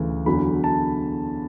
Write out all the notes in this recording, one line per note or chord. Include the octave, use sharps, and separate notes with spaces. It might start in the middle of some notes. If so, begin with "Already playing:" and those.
Already playing: D2 C#3 E3
E2 D3 F#3 B5
A5